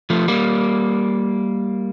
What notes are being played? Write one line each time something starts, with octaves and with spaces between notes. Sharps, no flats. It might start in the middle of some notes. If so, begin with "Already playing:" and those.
F3 A3
G3 A#3